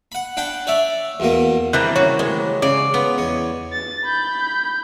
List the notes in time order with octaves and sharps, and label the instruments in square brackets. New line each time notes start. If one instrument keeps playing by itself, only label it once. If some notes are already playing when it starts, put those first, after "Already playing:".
[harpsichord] F#5 B5
D4 F#5 G5 B5
C#5 D5 E5
E2 B2 A#3
[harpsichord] C3 D#3 [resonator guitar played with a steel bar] E3 G3 A#3 [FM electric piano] F#6
[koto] C#3 F#4 [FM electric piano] C#5
[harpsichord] A1 D#3 [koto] G#3
[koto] C#3 [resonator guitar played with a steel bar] D5 [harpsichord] D#5 F5
[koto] B3 [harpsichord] F4 B4
[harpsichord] E2 C#5 D#5
[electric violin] A6
B5 G6